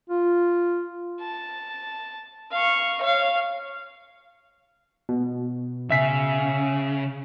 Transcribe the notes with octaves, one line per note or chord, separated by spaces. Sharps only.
F4
A5
F5 C#6
C#5 F5
B2
C#3 C#4 E5 B6 C7